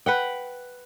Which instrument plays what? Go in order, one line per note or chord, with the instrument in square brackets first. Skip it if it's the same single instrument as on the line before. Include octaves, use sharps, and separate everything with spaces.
[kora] B4 F#5 G5